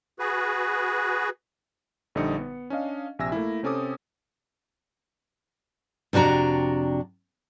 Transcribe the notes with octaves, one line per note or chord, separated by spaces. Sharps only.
F#4 G#4 B4
A#1 D3 G3 D#4 D#6 C#7
B3
C#4 D4 D#5 F5
A#1 C3 E5 G#5 E6 A#6
A3 A#3 E4
C3 C4 C#4 A4 D6 D#6
F2 C3 D4 F#4 A#5